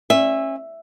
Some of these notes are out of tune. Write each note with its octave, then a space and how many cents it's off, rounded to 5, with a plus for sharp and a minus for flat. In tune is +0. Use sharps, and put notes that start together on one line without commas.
C#4 -30 E5 +0